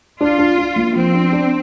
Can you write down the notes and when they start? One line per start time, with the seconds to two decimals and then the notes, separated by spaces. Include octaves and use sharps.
0.20 D4 F4
0.38 D4
0.58 D4
0.76 A#3
0.95 F3 C4
1.14 D4
1.33 D4